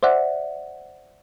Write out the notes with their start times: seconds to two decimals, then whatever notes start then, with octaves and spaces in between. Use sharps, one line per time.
0.03 C5 D5 E5 F#5